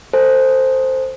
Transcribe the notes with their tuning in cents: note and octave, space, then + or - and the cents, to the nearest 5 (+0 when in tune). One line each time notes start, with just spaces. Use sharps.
A4 +30 C5 +0 G#5 +15